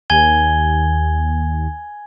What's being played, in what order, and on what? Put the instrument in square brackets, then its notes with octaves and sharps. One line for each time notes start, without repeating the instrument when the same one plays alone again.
[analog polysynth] D#2 [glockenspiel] G#5 G#6 G7